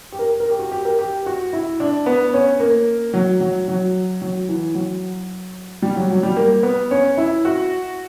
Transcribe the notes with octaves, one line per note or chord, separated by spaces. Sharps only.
G4
A#4
A#4
G4
F#4
G4
A#4
G4
F#4
E4
D4
B3
C#4
A#3
F#3
F#3
F#3
F#3
E3
F#3
G3
F#3
F#3
G3
A#3
B3
C#4
E4
F#4